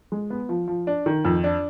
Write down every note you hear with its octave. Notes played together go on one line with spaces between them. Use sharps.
G#3
B3
F3
F3
D4
D#3
F2
D4